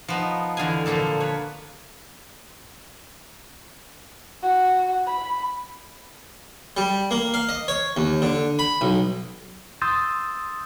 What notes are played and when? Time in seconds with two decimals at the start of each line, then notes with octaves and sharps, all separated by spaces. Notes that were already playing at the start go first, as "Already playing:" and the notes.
0.08 F3 B3 D#4
0.57 E2 D3 F5 G#5
0.86 A#2 D3 F3 A#3 A4
1.20 B4 C#5
4.42 F#4
5.06 B5
6.77 G3
7.11 A#3
7.34 F5
7.49 D#5
7.68 C#5
7.97 D#2
8.22 D3
8.59 B5
8.81 B1
9.82 C6 D#6 E6 G6 A6